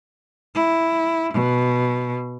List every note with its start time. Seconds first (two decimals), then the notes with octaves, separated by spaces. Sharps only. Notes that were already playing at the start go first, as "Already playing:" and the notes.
0.55 E4
1.33 B2